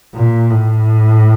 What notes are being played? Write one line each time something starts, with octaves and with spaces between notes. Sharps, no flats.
A#2
A2